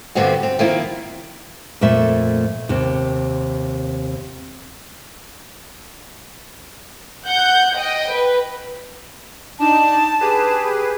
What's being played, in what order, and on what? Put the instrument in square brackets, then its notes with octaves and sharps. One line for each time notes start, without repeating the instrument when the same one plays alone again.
[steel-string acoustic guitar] G2 D3 G3 B3 C4 F#4
C4
D#3 F3 A#3 C4 E4
[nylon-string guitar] F2 A#2 A3 E5
D#2 C3
[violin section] F#5 G6
D#5 G5
B4
[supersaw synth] D4 D#4 [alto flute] A5
[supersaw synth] G4 G#4 B4